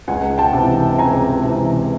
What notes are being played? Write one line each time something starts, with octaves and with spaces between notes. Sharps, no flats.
C#2 F#5 G#5
G5 A5
C3 E3
C#2 G#5 A#5
C3 E3